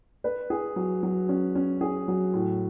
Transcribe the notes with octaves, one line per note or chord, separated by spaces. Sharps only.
B4
G#4
F#3
F#3
C#4
C#4
G#4
F#3
A2